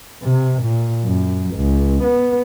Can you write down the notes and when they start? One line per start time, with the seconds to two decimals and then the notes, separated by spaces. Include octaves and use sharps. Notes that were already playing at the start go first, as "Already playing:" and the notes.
0.23 C3
0.62 A#2
1.05 F#2
1.55 C#2
2.03 B3